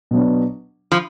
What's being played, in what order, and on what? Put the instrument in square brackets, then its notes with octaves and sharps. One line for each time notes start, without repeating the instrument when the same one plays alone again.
[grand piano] B2 F#3 B3 D4
[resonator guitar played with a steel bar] F3